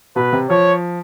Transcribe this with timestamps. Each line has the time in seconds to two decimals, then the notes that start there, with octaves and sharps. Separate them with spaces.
0.16 B2 B4
0.33 C3
0.49 F3 C#5